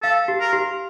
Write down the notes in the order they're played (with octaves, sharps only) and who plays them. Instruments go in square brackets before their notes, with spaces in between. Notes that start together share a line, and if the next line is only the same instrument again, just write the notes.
[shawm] A4 [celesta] F5
[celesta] G4
[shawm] A#4
[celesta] G4